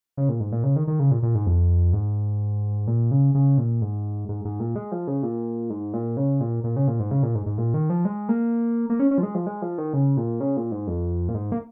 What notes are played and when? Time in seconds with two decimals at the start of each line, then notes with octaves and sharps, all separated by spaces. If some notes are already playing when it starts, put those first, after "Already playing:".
0.17 C#3
0.29 A#2
0.40 G#2
0.52 A#2
0.64 C#3
0.76 D#3
0.88 D#3
0.99 C#3
1.11 A#2
1.23 A#2
1.35 G#2
1.46 F2
1.93 G#2
2.87 A#2
3.11 C#3
3.35 C#3
3.58 A#2
3.82 G#2
4.29 G#2
4.45 G#2
4.60 A#2
4.76 G#3
4.92 F3
5.07 C#3
5.23 A#2
5.70 G#2
5.94 A#2
6.17 C#3
6.41 A#2
6.64 A#2
6.76 C#3
6.88 A#2
7.00 G#2
7.11 C#3
7.23 A#2
7.35 G#2
7.46 G#2
7.58 A#2
7.74 D#3
7.90 F3
8.05 G#3
8.29 A#3
8.90 A#3
9.00 C#4
9.11 C#4
9.18 F3
9.23 G#3
9.35 F3
9.47 G#3
9.62 F3
9.78 D#3
9.93 C#3
10.17 A#2
10.41 C#3
10.57 A#2
10.72 G#2
10.87 F2
11.29 A#2
11.35 G#2
11.52 A#3